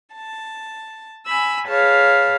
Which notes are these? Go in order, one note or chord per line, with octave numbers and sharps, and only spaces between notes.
A5
G#5 B5 E6
G#4 B4 C#5 F5 A5